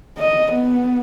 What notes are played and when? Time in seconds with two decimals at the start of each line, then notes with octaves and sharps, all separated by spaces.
0.19 D#5
0.53 B3